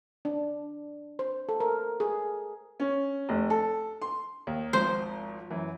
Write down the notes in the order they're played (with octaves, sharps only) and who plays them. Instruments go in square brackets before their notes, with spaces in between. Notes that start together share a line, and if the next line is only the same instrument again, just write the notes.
[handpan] D4
C5
A4
A#4
G#4
[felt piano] C#4
F1
A4
C6
[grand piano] D#2
[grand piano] G#1 G#2 F3 [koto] C5
[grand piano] F#2 E3